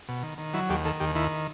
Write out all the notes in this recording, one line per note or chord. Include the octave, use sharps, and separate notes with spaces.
B2
D#3
D#3
F#3 E4
D#2 G4
D#3 A4
D#2 G4
D#3 E4